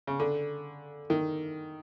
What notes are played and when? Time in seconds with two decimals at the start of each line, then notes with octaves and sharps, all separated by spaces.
0.07 C#3
0.20 D3
1.10 D#3